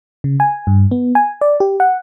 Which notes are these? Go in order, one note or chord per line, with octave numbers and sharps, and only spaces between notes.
C#3
G#5
G2
B3
G#5
D5
G4
F#5